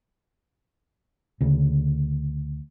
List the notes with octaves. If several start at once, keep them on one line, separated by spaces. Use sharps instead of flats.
D2 C#3